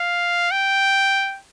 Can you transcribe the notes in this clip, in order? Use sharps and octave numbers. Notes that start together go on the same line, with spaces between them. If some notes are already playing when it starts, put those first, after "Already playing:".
Already playing: F5
G5